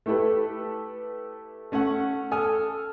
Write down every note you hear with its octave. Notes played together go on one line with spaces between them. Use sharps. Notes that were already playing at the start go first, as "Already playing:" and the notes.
A3 E4 G4 A4 B4
A3 C#4 A4 F#5
A4 G#5 D#6 F6